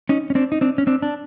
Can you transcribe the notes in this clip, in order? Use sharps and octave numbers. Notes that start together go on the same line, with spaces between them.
C#4 D#4
C#4
C4 D4
D#4
C4 D4
C#4
C4 D4
D4